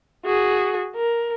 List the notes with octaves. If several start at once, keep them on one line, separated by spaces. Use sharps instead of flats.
F#4 G#4
A#4